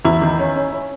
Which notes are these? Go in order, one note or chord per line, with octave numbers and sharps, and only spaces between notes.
E2 E4
D#3
C#4
C#4
C#4